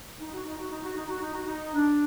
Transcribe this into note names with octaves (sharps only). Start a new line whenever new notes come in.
D#4
F#4
D#4
F#4
D#4
F#4
D#4
F#4
D#4
F#4
D#4
D4